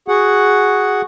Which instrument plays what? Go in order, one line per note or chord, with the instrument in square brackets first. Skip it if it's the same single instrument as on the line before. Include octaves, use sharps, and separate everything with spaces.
[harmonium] F#4 G#4 F#5